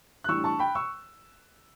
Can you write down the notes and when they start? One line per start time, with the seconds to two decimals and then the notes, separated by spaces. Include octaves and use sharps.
0.24 F#6
0.29 A2 E3 G3 D4 C#6 E6
0.44 A5 C#6
0.59 G5 B5
0.75 C#6 E6